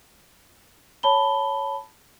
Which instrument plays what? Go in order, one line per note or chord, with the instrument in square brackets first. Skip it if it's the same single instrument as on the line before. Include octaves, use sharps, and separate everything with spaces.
[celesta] C#5 A5 B5 G7